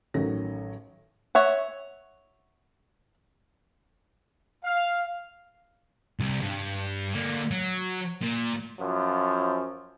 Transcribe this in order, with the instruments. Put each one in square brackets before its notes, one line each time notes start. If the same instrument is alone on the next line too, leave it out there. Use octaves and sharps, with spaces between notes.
[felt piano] A1 D#3 F#3 C#4 A4 A#6
[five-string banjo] C#5 E5 F#5
[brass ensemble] F5
[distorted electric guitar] C2
G2
D3 A#3
F#3
A#2
[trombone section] F#2 F3